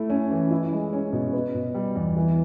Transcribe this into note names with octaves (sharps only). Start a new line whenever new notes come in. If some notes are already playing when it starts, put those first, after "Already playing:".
Already playing: A3 E4
C#4
E3
E4
G#3
C#4
B2
B3
B2
G3
E2
E3